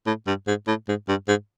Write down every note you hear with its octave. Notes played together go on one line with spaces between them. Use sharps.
A2
G2
G#2
A2
G#2
G2
G#2